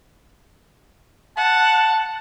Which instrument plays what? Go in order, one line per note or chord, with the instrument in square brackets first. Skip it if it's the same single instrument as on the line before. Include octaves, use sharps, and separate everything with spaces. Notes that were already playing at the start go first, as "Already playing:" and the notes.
[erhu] F#5 [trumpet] A5